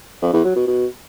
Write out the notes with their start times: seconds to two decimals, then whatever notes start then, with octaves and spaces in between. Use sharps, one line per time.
0.22 F2
0.33 E2
0.44 F#3
0.56 B2
0.67 B2